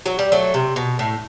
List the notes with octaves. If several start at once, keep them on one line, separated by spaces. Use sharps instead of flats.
F#3
G3
F#3 A3
C3
B2
A2